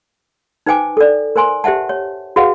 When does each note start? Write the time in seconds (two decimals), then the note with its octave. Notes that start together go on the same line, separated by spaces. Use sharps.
0.66 D#4 B4 C5 G5 G#5 D6
0.97 A4 D5
1.36 A#4 C5 G#5 C6
1.64 G4 C5 E5 F#5 A5
1.89 C#5
2.36 F#4 G#4 B4 D#5 F5 F#5